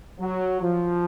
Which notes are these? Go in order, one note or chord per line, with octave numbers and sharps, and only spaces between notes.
F#3
F3